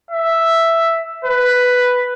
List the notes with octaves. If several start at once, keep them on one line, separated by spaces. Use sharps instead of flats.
E5
B4